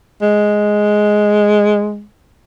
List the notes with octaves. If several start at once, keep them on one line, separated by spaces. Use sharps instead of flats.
G#3